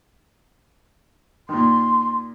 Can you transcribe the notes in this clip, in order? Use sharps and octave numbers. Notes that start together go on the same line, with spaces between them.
A#2 D#3 C6